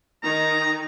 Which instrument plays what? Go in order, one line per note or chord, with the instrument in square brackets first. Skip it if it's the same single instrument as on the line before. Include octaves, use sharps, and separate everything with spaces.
[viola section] D#3 D#4 [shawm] A#5